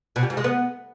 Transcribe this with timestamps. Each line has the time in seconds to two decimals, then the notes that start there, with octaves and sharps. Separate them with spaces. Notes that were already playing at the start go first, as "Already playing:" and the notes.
0.16 B2
0.23 G3
0.30 G#2
0.37 G#3
0.44 B3